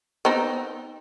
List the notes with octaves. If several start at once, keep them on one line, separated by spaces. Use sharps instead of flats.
B3 C4 D#4